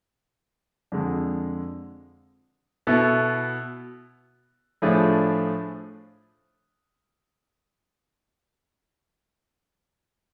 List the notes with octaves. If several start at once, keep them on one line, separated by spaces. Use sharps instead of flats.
F2 D3 G#3
B2 B3 E4 A4
A2 F3 A3 D4 G#4